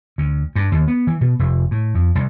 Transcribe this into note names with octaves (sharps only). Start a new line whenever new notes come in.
D2
G2
D#2
B3
E3
B2
F1
A2
F2
C2